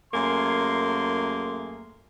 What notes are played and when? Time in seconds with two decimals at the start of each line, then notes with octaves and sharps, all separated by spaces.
0.13 F#2 A3 A#3 G#4 C6